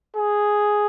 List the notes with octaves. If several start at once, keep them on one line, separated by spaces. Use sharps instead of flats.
G#4